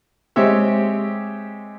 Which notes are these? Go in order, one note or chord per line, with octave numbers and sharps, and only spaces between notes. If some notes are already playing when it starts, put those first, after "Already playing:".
G#3 C4 G4 C#5 E5